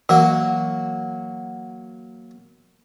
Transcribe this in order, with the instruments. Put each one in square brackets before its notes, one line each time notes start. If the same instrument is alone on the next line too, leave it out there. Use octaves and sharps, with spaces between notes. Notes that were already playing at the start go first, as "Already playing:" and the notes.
[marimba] E3 [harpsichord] F#3 A#3 F#4